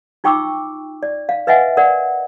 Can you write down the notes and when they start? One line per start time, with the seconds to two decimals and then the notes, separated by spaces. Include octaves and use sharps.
0.24 D#4 F4 G5 C#6 D6 E6
1.03 D5
1.29 F5
1.47 B4 D#5 E5 F#5 G#5
1.77 A#4 D5 F#5